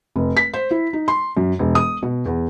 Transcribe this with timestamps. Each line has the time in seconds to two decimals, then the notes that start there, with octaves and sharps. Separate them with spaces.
0.16 F1
0.37 B6
0.53 C5
0.71 E4
0.93 D#4
1.08 C6
1.37 F#2
1.59 E1
1.75 D#6
2.03 B2
2.26 E2